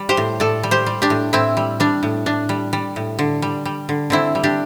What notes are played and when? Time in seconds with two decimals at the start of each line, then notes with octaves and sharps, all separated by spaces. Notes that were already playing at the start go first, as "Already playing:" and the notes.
Already playing: G3
0.09 G4 C5
0.17 A2
0.40 A2 A4 D5
0.63 G3
0.71 G4 C5
0.86 G3
1.02 D4 G4
1.10 A2
1.33 A2 C4 E4
1.57 G3
1.80 G3 D4
2.03 A2
2.26 A2 D4
2.49 G3
2.73 G3
2.96 A2
3.19 D3
3.42 G3
3.65 G3
3.89 D3
4.10 D3 C4 E4
4.35 G3
4.43 D4 G4